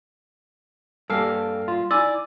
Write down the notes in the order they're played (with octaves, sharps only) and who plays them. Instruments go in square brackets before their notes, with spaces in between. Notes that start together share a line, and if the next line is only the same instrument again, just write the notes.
[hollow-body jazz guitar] G2 A#3 G4 [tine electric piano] A4 F5 [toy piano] G#5
[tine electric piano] F4
[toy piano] D#4 E6 [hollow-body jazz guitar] E4 G#5 [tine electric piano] D5